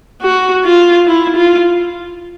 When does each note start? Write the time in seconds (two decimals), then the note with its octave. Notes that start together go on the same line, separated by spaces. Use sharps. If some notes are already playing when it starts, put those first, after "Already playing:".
0.22 F#4
0.64 F4
1.07 E4
1.37 F4